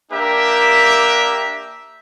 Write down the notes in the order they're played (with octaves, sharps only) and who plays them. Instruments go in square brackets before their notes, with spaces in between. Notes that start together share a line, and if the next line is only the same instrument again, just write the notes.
[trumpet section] A#3 D4 G4 A#4 E5